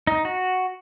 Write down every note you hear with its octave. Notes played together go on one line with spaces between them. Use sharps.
D#4
F#4